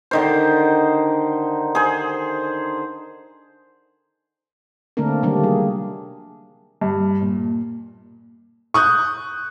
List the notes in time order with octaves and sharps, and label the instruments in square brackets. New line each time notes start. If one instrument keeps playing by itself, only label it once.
[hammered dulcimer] D3 D#3 C5
G#4 C5
[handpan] D3 A3 A#3 C4 D4 A#4
C3 D#3 F#3 G3 A#3 D4
G#4
[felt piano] G2
A#2
[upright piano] C#6 D#6 F#6 G6